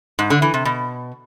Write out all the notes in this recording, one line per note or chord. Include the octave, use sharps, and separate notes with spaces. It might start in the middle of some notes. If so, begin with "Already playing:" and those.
G#2
D3
E3
C3
B2